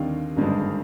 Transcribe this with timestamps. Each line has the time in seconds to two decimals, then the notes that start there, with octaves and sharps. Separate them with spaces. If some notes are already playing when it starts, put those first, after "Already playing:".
Already playing: D#2 D3 G3 C4 D#4 F5
0.36 G#1 G2 D3 G#3